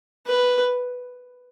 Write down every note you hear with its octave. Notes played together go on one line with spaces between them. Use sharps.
B4